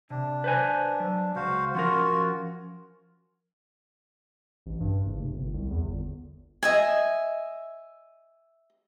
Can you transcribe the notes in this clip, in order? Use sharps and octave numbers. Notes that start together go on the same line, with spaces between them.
C3 D4
B4 C5 G#5
F#3
C#2 F#4 C5 F5
F3 C#4 F4 F#4 A#4
A1
G2
F#1
F1
G1
C2
E2
G1
D#5 E5 G#5